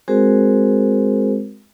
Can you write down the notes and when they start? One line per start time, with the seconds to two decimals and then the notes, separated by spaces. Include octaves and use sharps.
0.08 G#3 C4 F#4 G#4 A#4 C5